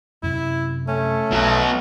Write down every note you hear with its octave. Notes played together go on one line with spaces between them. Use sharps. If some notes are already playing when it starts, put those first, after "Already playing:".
F#2 C3 E4
A3 C#4
B1 B2 F#3 B3